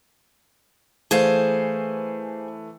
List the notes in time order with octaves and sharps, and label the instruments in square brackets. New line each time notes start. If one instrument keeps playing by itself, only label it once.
[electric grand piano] E3 A3 [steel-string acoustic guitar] G#4 C5 F5